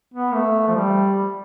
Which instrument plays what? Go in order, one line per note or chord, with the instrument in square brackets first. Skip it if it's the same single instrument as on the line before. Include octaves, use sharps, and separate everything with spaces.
[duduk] B3
A3
F3
G3